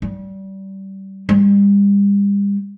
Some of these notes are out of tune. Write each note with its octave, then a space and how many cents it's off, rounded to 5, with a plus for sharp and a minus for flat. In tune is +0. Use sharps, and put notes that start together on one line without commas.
G3 -25
G3 +40